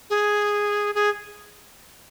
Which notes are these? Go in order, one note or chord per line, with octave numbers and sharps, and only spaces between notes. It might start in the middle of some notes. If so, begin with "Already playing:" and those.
G#4
G#4